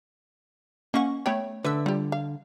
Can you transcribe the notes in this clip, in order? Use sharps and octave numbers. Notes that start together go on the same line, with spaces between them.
A#3 C#4 D#5 F#5 C#6
A3 B3 C#5 G5 B5
D3 A4 B4 E5 E6
G3 F4 G4
F5